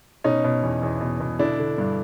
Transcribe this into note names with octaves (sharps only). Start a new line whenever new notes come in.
B2 C#4 D#4
B2
E2
E2
B2
B2
D3 D4 E4
D3
G2